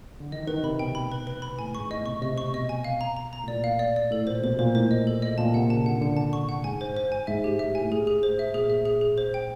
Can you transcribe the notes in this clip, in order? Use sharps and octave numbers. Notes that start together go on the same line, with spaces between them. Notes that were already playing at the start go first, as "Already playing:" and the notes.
D3
D#3 D#5
D#3 B4
C3 B5
B2 G5
A2 B5
B4
B4
B5
A2 G#5
G#2 C#6
A2 D#5
B2
C3 C#6
C3 D#5
C#6
B2 D#5
G#5
F5
A#5
A#5
A#5
A2
A#2 D5
F5
D5
D5
A2 A4
A#2 C5
B2 C5
A#2 C5
A2 C5
D#5
A4
D#5
A#2 A5
C3 F#5
C#3 A5
D3 F#5
D3 F#5
A5
C#6
F#5
G#2 G#5
C5
C5
G#5
G#2 E5
G4
A2 E5
G#5
A2
G#2 G#4
G#4
A2 C5
E5
A#2 G#4
E5
G#4
G#4
C5
G5